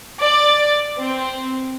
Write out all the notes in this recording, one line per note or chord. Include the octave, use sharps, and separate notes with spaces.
D5
C4